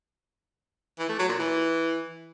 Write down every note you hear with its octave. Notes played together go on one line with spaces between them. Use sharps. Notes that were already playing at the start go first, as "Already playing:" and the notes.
E3
A3
F#3
A#2
E3